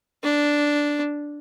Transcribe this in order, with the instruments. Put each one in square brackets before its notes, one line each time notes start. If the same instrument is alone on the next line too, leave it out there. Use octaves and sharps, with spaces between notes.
[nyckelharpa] D4